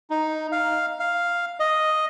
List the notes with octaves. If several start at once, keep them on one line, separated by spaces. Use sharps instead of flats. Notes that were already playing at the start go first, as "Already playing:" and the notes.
D#4
F5
F5
D#5